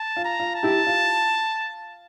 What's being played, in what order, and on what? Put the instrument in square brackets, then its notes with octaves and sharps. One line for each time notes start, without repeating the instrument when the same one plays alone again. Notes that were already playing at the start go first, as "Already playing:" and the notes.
Already playing: [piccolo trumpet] A5
[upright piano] F4
[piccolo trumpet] A#5
[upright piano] F4
[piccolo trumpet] A5
[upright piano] E4 G4
F4